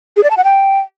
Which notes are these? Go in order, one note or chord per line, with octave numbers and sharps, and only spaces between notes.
G#4
D5
A5
F#5
G5